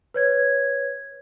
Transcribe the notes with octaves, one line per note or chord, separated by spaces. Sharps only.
B4 C#5 G#6